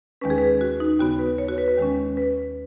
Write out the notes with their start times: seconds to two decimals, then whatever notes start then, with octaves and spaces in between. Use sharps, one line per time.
0.21 D#2 D#3 G#3 C#4 B4
0.30 G#4
0.38 B4
0.61 F#4
0.80 D#4
0.99 D#2 C#3 B3 F#4
1.19 B4
1.38 C#5
1.48 F#4
1.58 B4
1.68 B4
1.78 D#2 D#3 G#3 C#4
2.17 B4